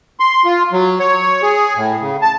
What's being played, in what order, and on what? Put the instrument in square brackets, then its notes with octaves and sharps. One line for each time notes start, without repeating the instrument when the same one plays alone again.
[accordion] C6
F4
F#3
C#5
G#4
A2
C#3
A5